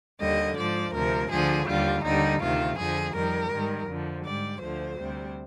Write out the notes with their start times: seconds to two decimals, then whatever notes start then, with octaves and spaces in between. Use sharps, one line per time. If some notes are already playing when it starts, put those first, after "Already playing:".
0.19 D#2 D3 G3 D#5
0.56 G#2 F3 D5
0.93 D2 C3 F3 A#4
1.29 D2 D3 F3 G#4
1.66 D#2 D3 G3 F4
2.03 D#2 D3 G3 D#4
2.40 D2 C3 D#3 F4
2.76 F2 D3 F3 G#4
3.14 F2 D#3 G3 A#4
3.51 G#2 D#3 G3
3.87 F2 D3 F3
4.25 G#2 G3 D5
4.61 D2 D3 F3 C5
4.98 D2 C3 G3